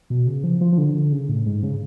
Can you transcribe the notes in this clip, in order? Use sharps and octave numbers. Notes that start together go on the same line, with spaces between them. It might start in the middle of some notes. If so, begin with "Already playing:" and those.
B2
C#3
F3
F3
F3
D3
D3
C#3
A2
G#2
C#3